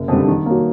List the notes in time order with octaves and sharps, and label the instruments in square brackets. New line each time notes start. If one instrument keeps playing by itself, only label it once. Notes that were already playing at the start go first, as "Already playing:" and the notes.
Already playing: [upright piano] F#1
F2 D3 G3
D#3
F#3 A#3